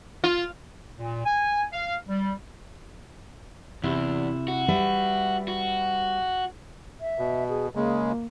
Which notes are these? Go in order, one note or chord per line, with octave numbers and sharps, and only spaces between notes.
F4
A#2
G#5
F5
G3
E2 C3 E4
F#4
G3 B4 E5
F#4
E5
B2
G#4
C#3 G#3 A#3